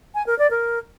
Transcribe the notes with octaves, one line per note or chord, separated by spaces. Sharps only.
G#5
A#4
D5
A#4